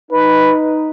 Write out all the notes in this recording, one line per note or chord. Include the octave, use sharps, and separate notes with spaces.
D#4 B4